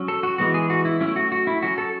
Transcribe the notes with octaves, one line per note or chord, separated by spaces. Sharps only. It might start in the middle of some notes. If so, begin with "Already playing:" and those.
Already playing: F#3 C#4
A4
F#4
E3 G#3 B3 F#4
G#4
F#4
E4
F#3 A3 C#4 E4
F#4
F#4
E4
F#3 C#4 F#4
A4